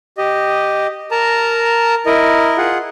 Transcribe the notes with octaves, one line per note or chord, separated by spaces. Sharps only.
G4 D#5
A#4 A5 A#5
E4 A#4 D#5
F4 G#4 F#5